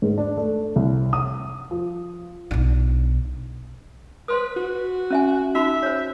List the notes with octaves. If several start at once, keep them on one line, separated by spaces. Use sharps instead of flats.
G#2
D4
A3
C2
D#6
F3
B1 D4
B4 C5 C6 D#6
F#4
C#4 E5 G#5
D#4 F#4 E5 B5
C5 C#5